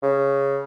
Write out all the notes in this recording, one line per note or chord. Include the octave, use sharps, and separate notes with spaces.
C#3